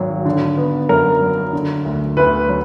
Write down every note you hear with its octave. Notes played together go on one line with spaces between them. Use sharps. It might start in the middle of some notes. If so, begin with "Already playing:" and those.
Already playing: G#1 F#3
D3
B3
F#2 A#4
F#3
D3
D2
D2 B4
F#3